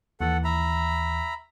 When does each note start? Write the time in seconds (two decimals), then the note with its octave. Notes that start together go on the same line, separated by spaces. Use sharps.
0.21 D#2 E3 A4 F#5
0.44 E5 A#5 B5